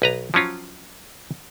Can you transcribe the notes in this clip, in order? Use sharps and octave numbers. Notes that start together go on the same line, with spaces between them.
B1 B4 A#5
F3 F#3 C#4 F4